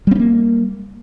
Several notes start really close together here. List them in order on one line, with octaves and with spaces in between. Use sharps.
G3 C4 C#4 A#3